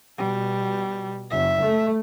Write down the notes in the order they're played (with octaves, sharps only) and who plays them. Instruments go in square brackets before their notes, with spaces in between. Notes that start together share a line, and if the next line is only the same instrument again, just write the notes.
[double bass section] B2 [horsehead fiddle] G3
[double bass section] F#1 [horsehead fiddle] E5
[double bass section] A3